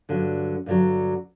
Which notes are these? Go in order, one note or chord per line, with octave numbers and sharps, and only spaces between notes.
G2 D3 F#3
G2 D3 F#3